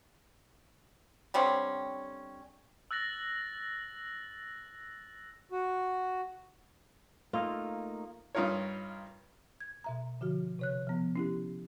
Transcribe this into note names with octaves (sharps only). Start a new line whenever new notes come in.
D3 G3 C4 C#4
E6 F#6 A6 A#6 F#7
F#4
A3 A#3 D#4 F4
G2 D#4 F4 A#4 C#5
G#6
B2 E5 A#5
D3 F3 F#4
C3 C#5 F#6
F3 B3
C#4 E4 G4